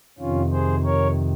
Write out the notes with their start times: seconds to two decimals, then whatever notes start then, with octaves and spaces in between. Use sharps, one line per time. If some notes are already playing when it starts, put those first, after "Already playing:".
0.18 F2 C3 D#3 C#4 F4
0.52 G#4 C5
0.85 A#4 C#5